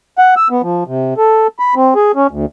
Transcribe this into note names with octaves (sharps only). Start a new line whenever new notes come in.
F#5
E6
B3
F3
C3
A4
B5
C4
G#4
C#4
D2